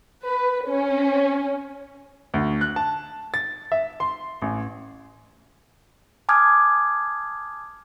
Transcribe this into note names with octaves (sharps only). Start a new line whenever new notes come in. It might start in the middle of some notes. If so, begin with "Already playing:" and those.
B4
C#4
D2
F#6
A5
A6
E5
C6
A1
G#5 A5 D6 D#6 F6 G#6